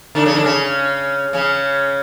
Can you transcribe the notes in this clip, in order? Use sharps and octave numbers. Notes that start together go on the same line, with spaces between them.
D3 D4
C#3 C#4
D3 D4
C#3 C#4
C#3 C#4